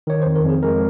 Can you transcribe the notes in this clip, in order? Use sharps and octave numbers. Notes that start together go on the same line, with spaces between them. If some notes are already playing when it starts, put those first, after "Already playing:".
D#3 C#5
C5
F2
A#4
F2 G#4
G#3 A#4